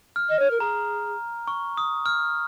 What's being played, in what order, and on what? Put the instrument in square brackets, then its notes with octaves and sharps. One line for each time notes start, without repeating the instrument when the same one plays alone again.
[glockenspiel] F6
[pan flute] D#5
C#5
A#4
[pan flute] G#4 [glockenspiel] A#5
[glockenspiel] C#6
D#6
F6